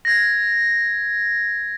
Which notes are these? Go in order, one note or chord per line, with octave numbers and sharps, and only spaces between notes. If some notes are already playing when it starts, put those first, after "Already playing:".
G#6 A#6